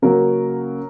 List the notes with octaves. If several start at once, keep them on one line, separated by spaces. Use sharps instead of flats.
C#3 F#3 A#3 A#4